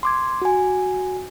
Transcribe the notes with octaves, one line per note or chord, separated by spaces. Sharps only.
C6 D6 G#6
F#4 G#5